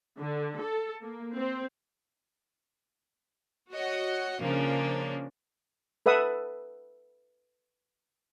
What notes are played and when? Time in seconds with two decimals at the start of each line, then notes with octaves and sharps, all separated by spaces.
0.18 D3
0.59 A4
1.02 A#3
1.35 C4
3.72 F#4 C#5 D#5 F#5
4.41 C#3 F3 A#3 C#4 D4
6.06 A4 B4 E5 F#5 D#6